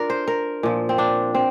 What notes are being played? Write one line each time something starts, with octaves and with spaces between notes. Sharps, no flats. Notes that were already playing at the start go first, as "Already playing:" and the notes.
Already playing: D4 F4 A#4
C5
A#4
A#2 F3
C4
D4
C4